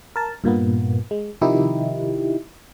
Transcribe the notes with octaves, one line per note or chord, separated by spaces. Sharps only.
A#4 A5
G2 A#2 A#3 B3
G#3
C3 D#3 F3 D#4 E4 G4